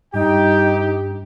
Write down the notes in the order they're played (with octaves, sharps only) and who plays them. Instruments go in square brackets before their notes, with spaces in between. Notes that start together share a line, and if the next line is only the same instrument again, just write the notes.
[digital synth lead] G2 [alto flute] D#4 [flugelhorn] G4 [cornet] G5